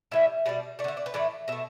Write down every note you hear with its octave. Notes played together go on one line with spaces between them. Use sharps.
A2 E3 G3 E5
B2 G3 D5
A3 D5
D3 E5
D5
B4
A2 E3 A3 D5
B2 A3 E5